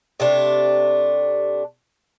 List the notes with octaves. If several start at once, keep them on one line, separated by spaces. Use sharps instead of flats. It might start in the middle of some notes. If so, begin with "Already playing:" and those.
C3 A3 D4